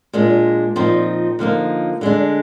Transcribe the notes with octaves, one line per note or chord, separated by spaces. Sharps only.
A#2 G#3 D4
A#2 F3 C4 D#4
D3 F3 A#3 D#4
D3 G#3 D4